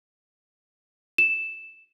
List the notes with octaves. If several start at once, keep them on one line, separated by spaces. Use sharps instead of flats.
E7